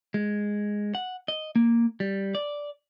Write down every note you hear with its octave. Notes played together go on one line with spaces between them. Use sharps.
G#3
F#5
D#5
A#3
G3
D5